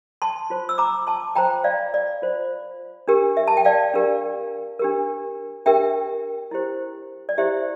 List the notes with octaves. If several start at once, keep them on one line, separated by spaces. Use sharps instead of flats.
A5 C6
F4 C5
E6
A#5 D6
A5 C6
F4 C5 G5 A#5
D5 F5
D5
F4 C5
D4 G4 A#4
E5
A5
G5
D5 F5
D4 G4 A#4
D4 G4 A#4
D4 G4 A#4 E5 G5
E4 G4 C5
D5
E4 G4 C5 E5